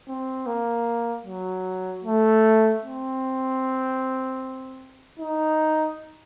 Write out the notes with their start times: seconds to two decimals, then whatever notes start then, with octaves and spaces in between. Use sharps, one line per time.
0.08 C4
0.46 A#3
1.26 F#3
2.04 A3
2.83 C4
5.20 D#4